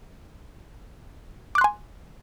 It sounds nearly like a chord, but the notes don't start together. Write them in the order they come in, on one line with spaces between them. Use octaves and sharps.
D6 F#6 C6 G#5